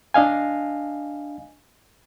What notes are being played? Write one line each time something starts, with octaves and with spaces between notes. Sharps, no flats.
D4 D#5 F5 G#5